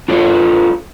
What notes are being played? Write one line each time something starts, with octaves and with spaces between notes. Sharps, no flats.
D4 F4 A4 C#5